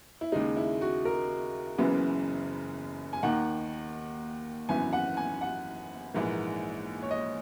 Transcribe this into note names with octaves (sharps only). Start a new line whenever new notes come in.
E4
D#2 C#3 G#3 D#4
E4
F#4
A#4
F#1 F#2 C#3 E3 B3
G#5
D#2 D#3 A#3 F#5
G#1 F#2 E3 B3 G#5
F#5
G#5
F#5
A#1 G#2 E3 A#3
C#5
D#5